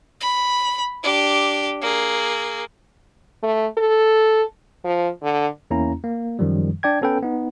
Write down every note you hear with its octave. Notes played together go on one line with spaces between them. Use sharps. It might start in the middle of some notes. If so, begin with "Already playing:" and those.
B5
D4 G4
A#3 G#4
A3
A4
F3
D3
E2 A#3 C#4 E4 A#5
A#3
F#2 D#3 F3 G3
D4 D5 G5 G#6
B3 C#4 A4 B4 G5
B3 D#4